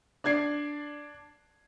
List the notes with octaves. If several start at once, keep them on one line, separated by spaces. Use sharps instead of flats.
D4 D5 G#6 C7